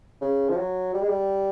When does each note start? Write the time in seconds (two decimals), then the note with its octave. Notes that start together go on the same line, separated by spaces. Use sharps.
0.21 C#3
0.50 F3
0.57 F#3
0.94 G3
1.01 G#3
1.08 G3